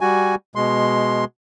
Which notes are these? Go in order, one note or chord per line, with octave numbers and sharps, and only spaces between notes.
G3 F#4 G#5
B2 G#3 C6